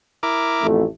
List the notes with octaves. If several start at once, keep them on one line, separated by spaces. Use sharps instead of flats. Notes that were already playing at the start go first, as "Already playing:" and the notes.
E4 A#4 D6
A1 F2 A3